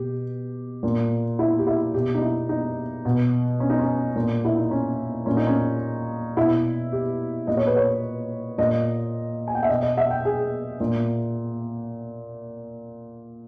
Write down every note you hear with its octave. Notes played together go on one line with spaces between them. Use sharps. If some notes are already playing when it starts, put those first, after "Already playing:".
Already playing: B2 G4
A#2
E4
G4
E4
B2 G4
D#4
E4
D#4
B2
C#4
D#4
C#4
A#2
E4
D#4
C#4
A#2 C#4
D#4
C#4
B2 E4
G4
A#2 D#5
C#5
B4
C#5
A#2 D#5
G#5
G5
E5
B2 D#5
D#5
E5
G5
G#4
A#2